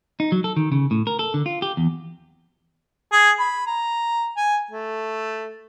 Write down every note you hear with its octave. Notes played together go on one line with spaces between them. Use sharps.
D#4
F#3
A4
D#3
C#3
A2
A#4
A4
D3
F4
G4
E2
G#4
B5
A#5
G#5
A3